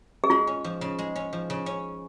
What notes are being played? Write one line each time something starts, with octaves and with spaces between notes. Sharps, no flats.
G#4
G#3 F4
C#4
F3
C#3
G#3
C#4
F3
C#3
C#4